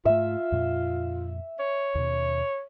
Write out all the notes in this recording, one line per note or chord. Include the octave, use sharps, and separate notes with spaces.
G#2 A3 F4 E5
F2 A#2
C#5
D#2 B2